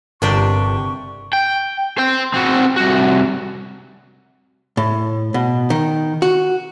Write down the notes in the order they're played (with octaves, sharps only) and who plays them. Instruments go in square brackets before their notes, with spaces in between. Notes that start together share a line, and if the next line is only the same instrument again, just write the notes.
[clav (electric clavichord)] G1 A#4 [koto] C3 D4 G4 [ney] C#6
[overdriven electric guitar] G5
C5 G5
C4 F#4
C2 F#4
[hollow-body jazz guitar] A2
B2
D#3
F#4